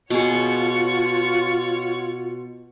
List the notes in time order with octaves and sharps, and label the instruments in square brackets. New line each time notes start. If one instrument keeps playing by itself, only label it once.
[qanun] B2 G#4 [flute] F4 [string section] C#5 F#5 C#6